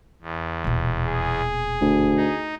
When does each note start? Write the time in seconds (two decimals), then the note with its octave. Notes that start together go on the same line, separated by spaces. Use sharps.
0.22 E2
0.64 D#1 B2
1.08 G#4
1.81 D2
2.16 D#4